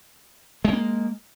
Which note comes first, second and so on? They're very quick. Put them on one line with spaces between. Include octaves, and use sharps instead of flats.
G#3 C4 A#3